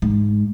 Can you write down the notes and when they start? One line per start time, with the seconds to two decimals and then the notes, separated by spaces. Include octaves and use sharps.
0.02 G#2